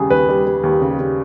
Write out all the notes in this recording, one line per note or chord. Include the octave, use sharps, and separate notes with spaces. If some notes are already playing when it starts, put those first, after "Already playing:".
Already playing: D#2 C#3 G3 G#4
D#2 B4
G3
G3
D#2
C#3
C#3